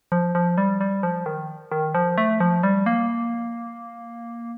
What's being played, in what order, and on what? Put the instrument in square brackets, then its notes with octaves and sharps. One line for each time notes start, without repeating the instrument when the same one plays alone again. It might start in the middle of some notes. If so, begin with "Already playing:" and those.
[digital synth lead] F3
F3
G3
G3
F3
D#3
D#3
F3
A3
F3
G3
A#3